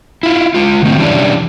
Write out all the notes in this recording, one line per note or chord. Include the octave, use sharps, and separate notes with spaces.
E4 F4
G#3 F4
D3 A3 C4
E3 G3 C#4 D4 E4